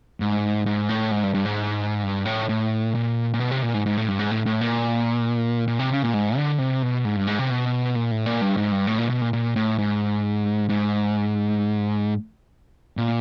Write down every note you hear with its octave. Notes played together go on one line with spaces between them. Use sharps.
G#2
G#2
A2
G#2
G2
G2
G#2
G2
A2
A2
A#2
A#2
B2
C3
A#2
G#2
G#2
A2
G2
G#2
A2
A2
A#2
A#2
C3
C#3
A#2
G#2
D3
C3
B2
G#2
G2
G#2
C3
B2
A#2
A2
A#2
G2
G#2
G2
A2
A#2
B2
A#2
A#2
A2
G#2
G#2
A#2